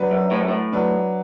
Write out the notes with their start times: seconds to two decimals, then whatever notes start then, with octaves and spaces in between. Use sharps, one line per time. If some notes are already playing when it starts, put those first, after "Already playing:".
Already playing: F#3 D4 B4
0.11 F#2
0.31 A2
0.39 F#2
0.48 A2
0.72 F#3 D4 B4